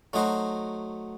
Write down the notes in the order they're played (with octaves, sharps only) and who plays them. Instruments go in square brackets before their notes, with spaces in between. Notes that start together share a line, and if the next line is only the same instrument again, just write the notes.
[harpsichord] F#3 A3 D#4 F#4 C5